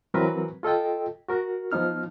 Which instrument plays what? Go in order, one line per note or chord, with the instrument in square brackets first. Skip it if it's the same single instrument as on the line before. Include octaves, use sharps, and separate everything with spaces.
[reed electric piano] E3 F#3 C4 F#4 A#4 B4
F4 A4 D#5 G5
F#4 A#4
F3 B3 D#4 F6